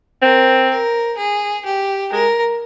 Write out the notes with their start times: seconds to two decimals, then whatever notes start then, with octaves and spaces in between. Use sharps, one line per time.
0.22 C4 A#4
0.70 A#4
1.17 G#4
1.65 G4
2.12 G#3 A#4